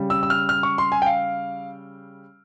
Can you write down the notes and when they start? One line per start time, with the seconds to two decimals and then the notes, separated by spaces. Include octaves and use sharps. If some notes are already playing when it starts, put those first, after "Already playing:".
Already playing: C#3 G3
0.10 E6
0.23 E6
0.30 F6
0.49 F6
0.63 C#6
0.78 C6
0.92 G#5
1.02 G5
1.06 F5